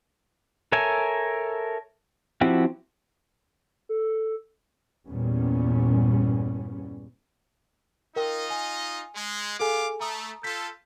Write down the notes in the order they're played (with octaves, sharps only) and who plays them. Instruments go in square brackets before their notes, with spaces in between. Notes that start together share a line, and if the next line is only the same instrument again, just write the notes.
[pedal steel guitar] A4 A#4 C#5 E5 G#5
F3 C4 E4 F#4 G4
[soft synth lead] A4
[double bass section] E2 G2 A#2 G3 B3 C#4
[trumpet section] D#4 F4 D#5 [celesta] A#4 G5
[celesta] G#5
[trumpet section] G#3
[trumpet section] B3 F5 D6 [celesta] G#4 A4 G#5
[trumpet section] A3 [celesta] A#5 D#6
[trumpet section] F4 A4 [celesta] G6 B6